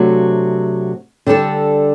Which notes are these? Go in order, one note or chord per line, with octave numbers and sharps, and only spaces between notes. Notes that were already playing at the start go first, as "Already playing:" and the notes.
Already playing: C3 F#3 A3 D4 F#4
D3 G3 D4 A4